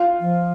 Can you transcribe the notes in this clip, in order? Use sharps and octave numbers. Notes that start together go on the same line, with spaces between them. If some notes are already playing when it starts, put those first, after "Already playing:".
Already playing: F4
F3